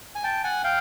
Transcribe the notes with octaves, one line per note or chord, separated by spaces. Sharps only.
G#5
G5 A5
F#5 G#5
F5 G5